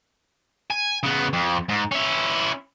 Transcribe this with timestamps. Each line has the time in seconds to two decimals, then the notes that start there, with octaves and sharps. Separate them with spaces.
0.70 G#5
1.03 C#3 B3
1.33 F2
1.69 G#2
1.92 C#4 E4